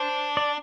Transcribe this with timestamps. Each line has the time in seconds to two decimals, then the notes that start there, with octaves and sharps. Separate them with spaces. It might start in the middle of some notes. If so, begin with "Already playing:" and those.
Already playing: D4 C5
0.37 D5